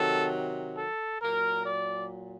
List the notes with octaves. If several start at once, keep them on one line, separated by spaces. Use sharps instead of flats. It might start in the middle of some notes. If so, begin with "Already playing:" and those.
Already playing: C3 D#3 F#3 A4
A4
A#2 F#3 A#4
D5